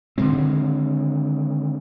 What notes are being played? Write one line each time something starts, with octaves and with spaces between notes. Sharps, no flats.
D3 D#3 G#3 C4